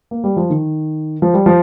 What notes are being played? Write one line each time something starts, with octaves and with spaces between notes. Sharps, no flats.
A#3
G3
F3
D#3
F3
G3
F3